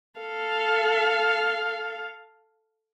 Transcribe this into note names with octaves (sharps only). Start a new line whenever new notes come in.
A4 F5